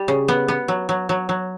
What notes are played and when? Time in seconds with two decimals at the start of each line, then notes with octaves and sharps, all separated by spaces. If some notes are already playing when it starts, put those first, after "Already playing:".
Already playing: G3
0.08 C#3
0.28 B3
0.48 B3
0.68 F#3
0.89 F#3
1.09 F#3
1.29 F#3